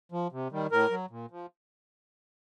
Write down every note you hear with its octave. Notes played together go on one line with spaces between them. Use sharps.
F3
C3
D#3 G3
A2 A#4
F#3
A#2
F3